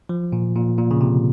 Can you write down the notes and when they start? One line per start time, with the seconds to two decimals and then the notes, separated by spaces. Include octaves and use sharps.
0.09 F3
0.32 A#2
0.56 A#2
0.78 A#2
0.91 C#3
1.01 C3